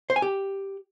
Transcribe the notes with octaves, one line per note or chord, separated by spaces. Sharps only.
C5
G#5
G4